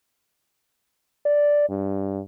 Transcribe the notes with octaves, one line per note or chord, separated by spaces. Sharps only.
D5
G2